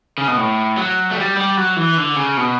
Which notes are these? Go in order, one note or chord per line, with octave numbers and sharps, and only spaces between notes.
C#3
B2
A2
F#3
A3
G3
G3
F#3
E3
D3
C#3
B2